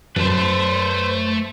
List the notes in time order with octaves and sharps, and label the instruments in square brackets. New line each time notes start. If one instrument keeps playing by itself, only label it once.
[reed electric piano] F#2 [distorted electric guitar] A3 A5 [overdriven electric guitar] B4 C5